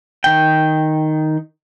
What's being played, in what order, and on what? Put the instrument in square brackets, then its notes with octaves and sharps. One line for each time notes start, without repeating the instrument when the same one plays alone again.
[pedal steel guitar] D#3 G5